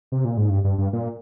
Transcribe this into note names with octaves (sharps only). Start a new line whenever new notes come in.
C3
A#2
G#2
G2
G2
G2
A#2